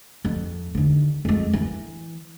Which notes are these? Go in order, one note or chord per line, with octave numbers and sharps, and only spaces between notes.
F2
D#2 D3
F2 G#3
E3